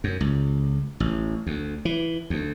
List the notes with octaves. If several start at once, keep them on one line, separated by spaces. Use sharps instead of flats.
F#2
C#2
A1
D2
E3
D2